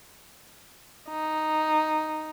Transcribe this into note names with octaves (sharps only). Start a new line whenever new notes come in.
D#4